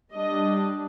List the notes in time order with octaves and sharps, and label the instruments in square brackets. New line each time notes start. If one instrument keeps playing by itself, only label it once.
[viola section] G3 D4 D#5